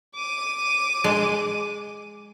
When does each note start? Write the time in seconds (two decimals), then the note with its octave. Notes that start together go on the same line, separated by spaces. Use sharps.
0.16 D6 D#7
1.04 G#3